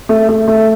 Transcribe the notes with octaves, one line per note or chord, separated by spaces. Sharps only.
A3
A3
A3